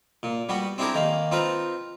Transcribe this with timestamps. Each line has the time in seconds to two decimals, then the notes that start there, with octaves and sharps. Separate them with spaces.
0.23 A#2
0.49 G3 B3 F#4
0.78 C4 D4 E4 G4 G#4 A#4
0.95 D#3 A#3
1.31 C4 D#4 F4 A#4 B4